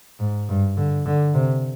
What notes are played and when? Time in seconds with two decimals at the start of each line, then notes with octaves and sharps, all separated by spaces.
0.20 G#2
0.49 G2
0.77 D3
1.06 D3
1.34 C3